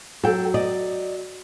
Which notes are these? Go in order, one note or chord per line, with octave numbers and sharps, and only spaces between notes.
F#3 A4 G5
D5 D#5